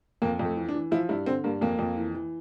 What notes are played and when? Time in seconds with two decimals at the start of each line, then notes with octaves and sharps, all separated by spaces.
0.22 F2 A#3
0.39 F2
0.45 A3
0.57 E3
0.68 D4
0.74 E3
0.91 F3 E4
1.09 G2 E4
1.26 D3 C4
1.44 G2 A#3
1.61 F2 A#3
1.79 F2
1.97 E3
2.15 E3